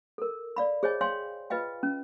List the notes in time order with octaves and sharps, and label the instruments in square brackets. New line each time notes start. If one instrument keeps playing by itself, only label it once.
[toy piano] A4 A#4
D5 F5 B5
G#4 C5 C#5 D#5 G#5
C#5 F5 G5 G#5 C6
F4 B4 D#5 F5 G5
C#4